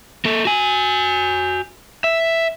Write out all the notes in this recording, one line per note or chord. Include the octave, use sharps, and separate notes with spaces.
A#3 A4
F#4 G#5
E5